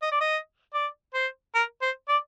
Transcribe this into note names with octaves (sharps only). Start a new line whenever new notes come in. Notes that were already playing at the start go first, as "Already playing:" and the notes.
D#5
D5
D#5
D5
C5
A#4
C5
D5